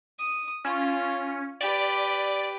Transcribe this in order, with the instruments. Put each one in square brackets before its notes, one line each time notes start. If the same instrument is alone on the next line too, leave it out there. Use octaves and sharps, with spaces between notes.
[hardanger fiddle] D#6
[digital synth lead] C#4 [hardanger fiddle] F4
[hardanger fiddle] G4 B4 [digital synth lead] D5